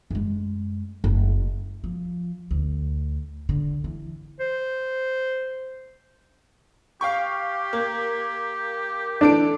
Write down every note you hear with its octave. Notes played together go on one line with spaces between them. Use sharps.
F#2 G#3
F#1
F3
D2
D3
E3
C5
G4 F5 G5 C#6
A#3
E3 D4 A4 D7